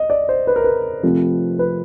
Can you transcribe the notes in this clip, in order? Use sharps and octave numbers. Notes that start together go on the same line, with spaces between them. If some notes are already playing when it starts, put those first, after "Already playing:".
Already playing: D#5
D5
C5
B4
A#4
B4
C3 F3 A3 C4
B4